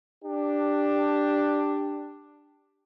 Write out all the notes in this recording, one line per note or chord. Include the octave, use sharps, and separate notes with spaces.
D4 G4